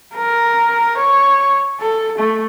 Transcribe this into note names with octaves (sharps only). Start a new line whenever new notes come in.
A#4
C#5
A4
A3